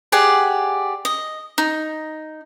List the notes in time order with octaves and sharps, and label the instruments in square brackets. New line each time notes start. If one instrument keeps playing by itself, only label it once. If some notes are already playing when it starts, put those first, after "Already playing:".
[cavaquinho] G4 G#4 D5 F#5
D#5
D#4